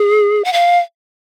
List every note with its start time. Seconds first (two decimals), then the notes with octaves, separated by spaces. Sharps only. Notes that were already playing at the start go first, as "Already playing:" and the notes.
Already playing: G#4
0.45 F#5
0.53 F5